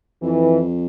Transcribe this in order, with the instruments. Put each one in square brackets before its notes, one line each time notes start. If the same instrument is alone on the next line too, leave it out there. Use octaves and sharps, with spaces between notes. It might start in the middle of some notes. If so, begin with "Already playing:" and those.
[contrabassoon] F2 [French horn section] E3